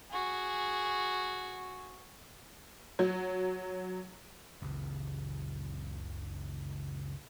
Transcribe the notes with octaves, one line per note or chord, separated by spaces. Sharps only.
F#4 G#4
F#3
F#1 C#2